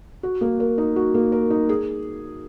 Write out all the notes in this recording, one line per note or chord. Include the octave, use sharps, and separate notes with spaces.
F#4
A#3
A#4
D#4
F#4
A#3
A#4
D#4
G#4